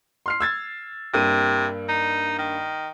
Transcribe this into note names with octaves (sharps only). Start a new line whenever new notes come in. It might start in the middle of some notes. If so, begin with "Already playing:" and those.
C6 F6 C7
E6 G#6 A6
G2 C3 A#3 D#7
D#4
D#3